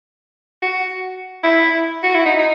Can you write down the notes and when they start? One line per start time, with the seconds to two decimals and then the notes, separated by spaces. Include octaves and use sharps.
0.62 F#4
1.44 E4
2.03 F#4
2.15 E4
2.26 D#4
2.38 D#4